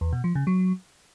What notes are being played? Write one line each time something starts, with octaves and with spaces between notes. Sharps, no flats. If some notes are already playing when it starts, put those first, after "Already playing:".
E2
B2
F3
C#3
F#3